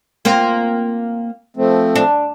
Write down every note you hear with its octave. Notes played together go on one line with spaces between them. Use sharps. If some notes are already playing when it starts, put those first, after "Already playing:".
A#3 C4 F4
F3 A3 C4
D4